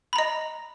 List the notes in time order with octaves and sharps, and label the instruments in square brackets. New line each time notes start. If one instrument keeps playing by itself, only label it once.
[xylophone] B5
A#5
D#5